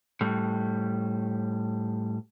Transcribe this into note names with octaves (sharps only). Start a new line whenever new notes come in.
A2 G3